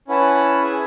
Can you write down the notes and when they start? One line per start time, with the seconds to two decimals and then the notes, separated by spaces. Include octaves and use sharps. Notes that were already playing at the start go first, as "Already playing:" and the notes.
0.08 C#4 E4 B4 F#5 A5
0.63 G#4 B4 E5 G#5